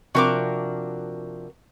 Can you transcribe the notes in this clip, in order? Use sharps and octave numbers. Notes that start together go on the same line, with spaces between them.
C3 F3 D4 F#4 A#4 D6